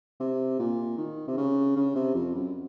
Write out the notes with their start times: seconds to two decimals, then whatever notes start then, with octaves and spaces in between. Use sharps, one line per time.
0.20 C3
0.59 A#2
0.98 D#3
1.27 C3
1.37 C#3
1.76 C#3
1.95 C3
2.15 F2
2.35 F#2